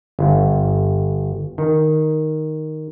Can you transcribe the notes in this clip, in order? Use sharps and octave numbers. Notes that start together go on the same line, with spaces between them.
G1
D#3